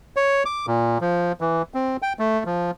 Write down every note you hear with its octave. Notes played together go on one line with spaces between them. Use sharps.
C#5
D6
A#2
F3
E3
C4
G5
A3
F3